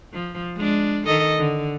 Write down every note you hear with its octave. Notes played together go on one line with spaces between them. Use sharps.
F3
G#3 D4
D#3 A4 D#5
D3